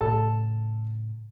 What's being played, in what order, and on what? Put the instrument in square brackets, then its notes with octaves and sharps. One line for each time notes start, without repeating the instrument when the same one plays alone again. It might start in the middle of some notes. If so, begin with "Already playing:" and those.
[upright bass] A2 C#3 [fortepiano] A4 A5